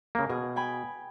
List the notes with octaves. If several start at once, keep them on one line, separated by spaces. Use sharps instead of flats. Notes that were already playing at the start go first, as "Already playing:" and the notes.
C#3 A#3
B2 G#4
G5 G#5 B5